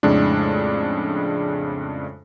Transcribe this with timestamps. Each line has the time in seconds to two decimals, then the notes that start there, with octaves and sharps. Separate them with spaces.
0.03 F2 A2 C#3 G#3 D4